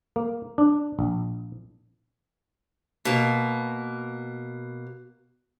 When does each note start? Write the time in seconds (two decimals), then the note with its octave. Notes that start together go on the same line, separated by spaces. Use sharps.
0.16 A#3
0.58 D4
0.99 A#1
3.05 B2 A#3